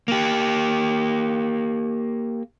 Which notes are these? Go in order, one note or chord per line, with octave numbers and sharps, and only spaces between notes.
A#3 G4